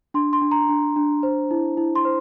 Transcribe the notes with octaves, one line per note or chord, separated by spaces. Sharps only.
D4 C6
C6
D4
A#5
D4
D4
C5
E4
E4
C6
C5